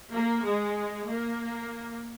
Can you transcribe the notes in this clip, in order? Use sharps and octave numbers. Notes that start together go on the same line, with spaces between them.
A#3
G#3
A#3